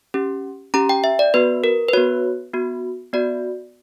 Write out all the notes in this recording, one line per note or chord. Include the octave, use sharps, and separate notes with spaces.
C#4 G4
C#4 G4 A#5
G5
E5
D5
B3 F#4 B4
A#4
B4
B3 F#4 C#5
B3 F#4
B3 F#4 D5